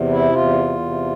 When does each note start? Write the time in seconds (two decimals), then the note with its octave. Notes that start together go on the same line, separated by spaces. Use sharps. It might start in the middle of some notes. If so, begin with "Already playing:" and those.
Already playing: E2 C3
0.10 E4
0.32 E2 F4
0.79 C3